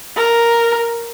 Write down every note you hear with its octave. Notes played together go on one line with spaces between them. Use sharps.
A#4